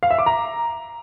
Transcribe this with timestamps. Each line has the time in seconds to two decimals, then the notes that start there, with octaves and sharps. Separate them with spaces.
0.03 F5
0.11 E5
0.18 D6
0.26 A#5